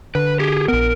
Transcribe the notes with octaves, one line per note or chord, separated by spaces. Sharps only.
D3 B4
G4 G#4
A#1 B3 A#4